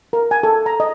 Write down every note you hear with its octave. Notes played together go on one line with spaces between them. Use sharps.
A#4
G#5
A4
A#5
D#5